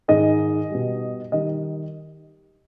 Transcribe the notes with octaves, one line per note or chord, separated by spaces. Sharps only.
G#2 D#3 G#3 D#5
B2 G3
D#3 G3 D#5